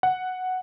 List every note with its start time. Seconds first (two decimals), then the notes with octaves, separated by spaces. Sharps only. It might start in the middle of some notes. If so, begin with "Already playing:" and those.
0.03 F#5